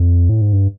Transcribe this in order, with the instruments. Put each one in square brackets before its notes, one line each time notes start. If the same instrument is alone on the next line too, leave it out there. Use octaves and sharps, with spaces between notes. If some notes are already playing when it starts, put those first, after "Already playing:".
Already playing: [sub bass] F2
A2
G#2
G2